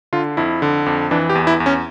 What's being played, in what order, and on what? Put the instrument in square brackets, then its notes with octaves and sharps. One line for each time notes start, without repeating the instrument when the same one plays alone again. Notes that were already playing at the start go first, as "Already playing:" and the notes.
[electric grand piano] D3 F4
F2 E4
D3
F2
E3 D4
G4
E2
E4
E2
C#4